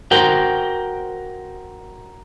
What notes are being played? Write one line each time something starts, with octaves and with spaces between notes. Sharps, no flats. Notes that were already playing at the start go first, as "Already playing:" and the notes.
F#4 A#4 C5 G5